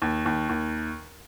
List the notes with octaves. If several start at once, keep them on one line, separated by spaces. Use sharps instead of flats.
D#2
D#2
D#2